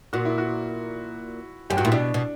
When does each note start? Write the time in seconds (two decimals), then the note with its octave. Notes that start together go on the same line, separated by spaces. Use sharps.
0.13 A#2 F#4
0.25 E4
0.38 F#4
1.70 F#2 G4
1.77 G2 F#4
1.85 A#2 E4
1.91 B2 D4
2.14 B2